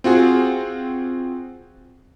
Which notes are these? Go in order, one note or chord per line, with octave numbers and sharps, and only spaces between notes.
C4 F4 F#4 G#4